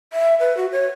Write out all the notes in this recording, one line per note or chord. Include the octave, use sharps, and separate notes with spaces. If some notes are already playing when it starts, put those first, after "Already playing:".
E5
B4
F#4
C#5